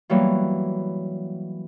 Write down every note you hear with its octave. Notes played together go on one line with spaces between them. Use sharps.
E3 F#3 G3 A#3 B3